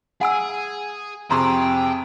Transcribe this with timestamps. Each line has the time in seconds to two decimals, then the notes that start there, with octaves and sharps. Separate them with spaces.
0.21 G#4 F#5 G#5 E6
1.31 F2 C3 G#4 G5 A#5 C6 C#6